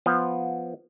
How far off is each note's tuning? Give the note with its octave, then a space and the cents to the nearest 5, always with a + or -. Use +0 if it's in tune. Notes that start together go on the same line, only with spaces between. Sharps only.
F3 +0 B3 +0